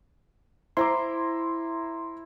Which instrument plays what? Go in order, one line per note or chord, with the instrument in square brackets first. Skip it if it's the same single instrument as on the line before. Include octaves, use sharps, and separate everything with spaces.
[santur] E4 [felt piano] C5 A#5 D6 [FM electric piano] C6